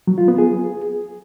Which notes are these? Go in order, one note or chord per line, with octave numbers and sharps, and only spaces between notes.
F#3
F4
B3
G#4